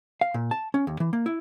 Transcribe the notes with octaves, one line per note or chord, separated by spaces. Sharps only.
F5
A#2
A5
C#4
D#2
E3
A#3
E4